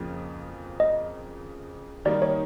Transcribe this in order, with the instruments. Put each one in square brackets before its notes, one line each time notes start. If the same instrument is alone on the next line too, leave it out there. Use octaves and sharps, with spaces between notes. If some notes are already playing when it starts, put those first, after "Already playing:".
Already playing: [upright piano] F2 C#3 F3 A#3
[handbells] D#5
[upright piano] D#3 G3 A#3 D#4 [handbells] D5
[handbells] C#5